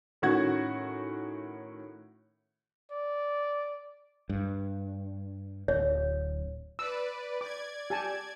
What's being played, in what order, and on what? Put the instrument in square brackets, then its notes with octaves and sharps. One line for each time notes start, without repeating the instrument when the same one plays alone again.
[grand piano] A2 D#3 C#4 F#4 F#5 G#6
[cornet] D5
[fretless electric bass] G2
[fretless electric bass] D1 [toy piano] C#5
[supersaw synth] B4 D5 [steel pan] E6
[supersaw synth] D5 G#6 [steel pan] D6
[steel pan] G4 G#5 A5